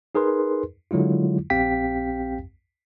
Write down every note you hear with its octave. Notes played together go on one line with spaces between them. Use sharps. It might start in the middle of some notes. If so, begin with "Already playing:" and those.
D#4 G#4 A#4 B4 C6
D3 F#3 G#3 E4 F4
A#1 C4 G4 F5 G5 B6